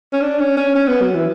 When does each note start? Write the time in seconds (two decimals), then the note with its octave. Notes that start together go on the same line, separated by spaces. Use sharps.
0.13 C#4
0.22 D4
0.39 C#4
0.57 C#4
0.75 C#4
0.88 B3
1.01 F#3
1.14 E3